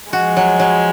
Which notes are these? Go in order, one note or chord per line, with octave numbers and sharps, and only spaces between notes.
F3 G#3 F#4
F#3
F#3